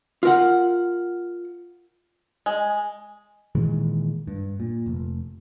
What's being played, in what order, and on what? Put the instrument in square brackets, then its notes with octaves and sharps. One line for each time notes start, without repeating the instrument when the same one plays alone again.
[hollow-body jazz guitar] F4 A#4 F#5
[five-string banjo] G#3
[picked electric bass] A#2 D#3 E3 G#3
G2
A#2
F1